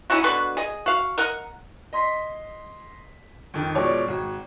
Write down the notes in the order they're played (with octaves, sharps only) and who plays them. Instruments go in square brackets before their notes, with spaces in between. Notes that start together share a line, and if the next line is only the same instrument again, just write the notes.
[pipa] C#4 D#4 E4 F#4
B2 D3 F#4 B4
G#4 D#5
F#4 F5
A#4 D#5 F#5
[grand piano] D#5 C6 B6
F2 D#3
B2 F3 G#3 C#5 D5 D6
G#1 F#4